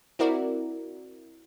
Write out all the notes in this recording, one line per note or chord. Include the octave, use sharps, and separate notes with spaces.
C4 E4 F#4 A#4 D5